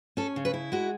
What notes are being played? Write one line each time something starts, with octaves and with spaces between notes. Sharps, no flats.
C#4 A4
C#3
B4
E4
G#3 F#4